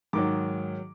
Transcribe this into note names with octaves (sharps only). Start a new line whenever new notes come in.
G#2 D#3 F#3 D6